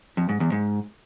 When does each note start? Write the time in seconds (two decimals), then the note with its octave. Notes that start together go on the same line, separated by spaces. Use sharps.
0.17 F2
0.29 G#2
0.40 E2
0.52 G#2